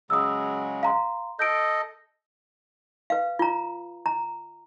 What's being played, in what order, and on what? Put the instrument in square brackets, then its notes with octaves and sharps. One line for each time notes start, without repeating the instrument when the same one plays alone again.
[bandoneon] C#3 F#3 G#3 [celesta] D#6 E6
[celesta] F5 A#5 C6
[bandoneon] A4 D#5 [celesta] G6 D7
[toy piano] B4 F5
F4 A#5
A#5